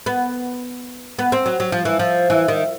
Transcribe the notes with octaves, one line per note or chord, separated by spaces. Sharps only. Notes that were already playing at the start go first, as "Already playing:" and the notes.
B3
B3
C4
F#3
F#3
F3
E3
F3
E3
D#3